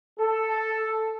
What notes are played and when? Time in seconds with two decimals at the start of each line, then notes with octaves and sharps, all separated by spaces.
0.18 A4